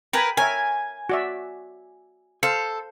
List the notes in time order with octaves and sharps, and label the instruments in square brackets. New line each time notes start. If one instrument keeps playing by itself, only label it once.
[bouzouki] A#4 B4 [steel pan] G5 G#5 B5
[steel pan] A#4 C#5 E5 [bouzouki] G#5
[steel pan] F#4 D5 E5
[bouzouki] A4 [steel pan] C5 F5